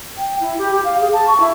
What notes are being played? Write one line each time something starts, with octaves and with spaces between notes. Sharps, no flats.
G5
E4
G4
G4
F5
G#4
A5
C#6
E4